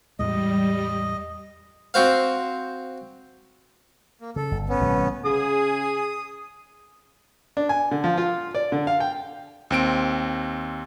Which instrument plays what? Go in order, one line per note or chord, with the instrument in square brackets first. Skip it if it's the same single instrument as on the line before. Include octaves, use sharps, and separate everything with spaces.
[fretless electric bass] E2 A2 G#3 [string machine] G3 [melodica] D#5
[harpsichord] C4 F#4 C5 F5
[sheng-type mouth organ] A#3
[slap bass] C#3 [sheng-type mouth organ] A4
[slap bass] G1
[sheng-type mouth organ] B3 C#4
[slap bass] A1 C3 G3
[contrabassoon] C#3 [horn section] G#4 [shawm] D#6
[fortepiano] D4
G#5
D3
F3
F4
D5
D3
F5
G5
[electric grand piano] D#2 C4 D7